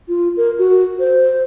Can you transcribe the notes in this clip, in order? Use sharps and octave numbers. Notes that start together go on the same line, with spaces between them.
F4
A#4
F#4
C5